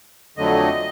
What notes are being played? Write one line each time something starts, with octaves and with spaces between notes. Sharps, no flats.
F2 D3 F#3 A3 D#5